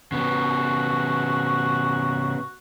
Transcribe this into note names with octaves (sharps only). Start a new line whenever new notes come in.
C#3 B3 F#4